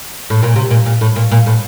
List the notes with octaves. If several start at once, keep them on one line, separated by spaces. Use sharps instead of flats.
A2
A#2
C3
A#2
A#2
A2
A#2
A#2
A2